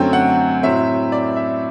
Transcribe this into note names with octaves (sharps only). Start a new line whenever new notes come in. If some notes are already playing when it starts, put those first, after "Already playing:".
Already playing: F#2 D3 F#3 A3 C4 G5
F#5
A2 F#3 C4 E5
D5
E5